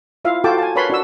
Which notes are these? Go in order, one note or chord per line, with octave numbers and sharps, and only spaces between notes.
E4 F4 E5 F5
F4 F#4 A4 G5 A5 D6
G#5 A5
A#4 B4 C#5 A5 B5 C6
D4 F#4 E6